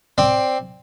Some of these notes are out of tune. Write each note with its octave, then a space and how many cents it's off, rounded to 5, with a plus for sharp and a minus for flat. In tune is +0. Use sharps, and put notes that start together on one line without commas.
C4 +0 D5 +0